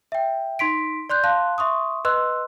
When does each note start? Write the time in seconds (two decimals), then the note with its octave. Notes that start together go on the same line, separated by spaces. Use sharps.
0.12 E5 G5
0.59 D#4 C6 B6 D7
1.10 D5 C6 F#6 G6
1.24 F5 A5 C6 F#6
1.58 E5 C6 C#6 D#6
2.05 B4 D#5 C6 E6 F#6